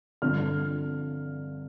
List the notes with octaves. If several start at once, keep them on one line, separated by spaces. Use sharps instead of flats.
G2 D3 F3 C4 F6